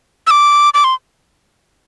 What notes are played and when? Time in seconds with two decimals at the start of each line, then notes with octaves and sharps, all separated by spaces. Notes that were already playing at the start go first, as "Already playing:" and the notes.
0.27 E6
0.31 D6
0.74 D6
0.84 C6